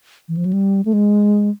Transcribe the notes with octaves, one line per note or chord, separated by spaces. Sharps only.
E3
F3
F#3
G3
A3
G#3